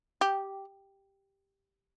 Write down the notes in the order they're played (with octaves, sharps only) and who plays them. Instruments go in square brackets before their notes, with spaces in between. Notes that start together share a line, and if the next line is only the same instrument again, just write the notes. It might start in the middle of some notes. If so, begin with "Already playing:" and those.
[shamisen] G4